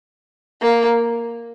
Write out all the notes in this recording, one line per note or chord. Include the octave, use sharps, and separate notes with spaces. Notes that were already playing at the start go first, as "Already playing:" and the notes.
A#3